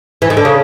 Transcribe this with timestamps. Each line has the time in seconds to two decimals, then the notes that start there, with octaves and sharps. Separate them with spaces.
0.22 E3
0.30 D#3
0.37 D3
0.45 C#3